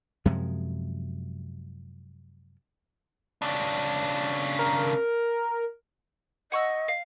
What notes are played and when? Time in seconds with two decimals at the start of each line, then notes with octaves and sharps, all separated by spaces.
0.25 F#2 C3 F3 G#3
3.42 C#3 D4
4.59 A#4
6.52 D#5 F#5 C#6 E6
6.88 F5